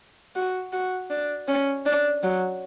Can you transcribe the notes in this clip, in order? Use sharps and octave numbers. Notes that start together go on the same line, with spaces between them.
F#4
F#4
D4
C#4
D4
F#3